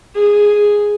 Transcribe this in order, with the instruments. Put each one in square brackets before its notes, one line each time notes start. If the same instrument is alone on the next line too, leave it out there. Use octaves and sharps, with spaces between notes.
[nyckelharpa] G#4